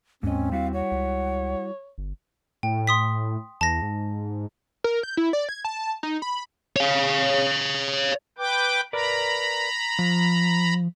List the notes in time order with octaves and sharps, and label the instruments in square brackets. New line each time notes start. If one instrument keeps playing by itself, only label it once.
[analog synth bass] D#2 [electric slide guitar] G#2 D#5 [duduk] C4 [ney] C#4
[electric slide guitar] G3 E4 F#4 [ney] F5
[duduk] C#5 [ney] F#5
[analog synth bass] C#2
G1
[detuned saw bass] A2 [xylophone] G5
[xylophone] C6 D#6 B6
[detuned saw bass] E2 [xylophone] A5 A#6
[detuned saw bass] G#2
[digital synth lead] A#4
G6
E4
D5
G#6
A5
D#4
B5
[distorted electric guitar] C#5 F5
[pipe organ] B4 G5 D6
[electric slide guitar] A#4 B4 D5 [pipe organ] A#5 B5
[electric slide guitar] F3